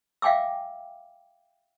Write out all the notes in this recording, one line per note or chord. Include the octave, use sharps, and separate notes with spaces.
E5 F5 G5 G#5 D6 E6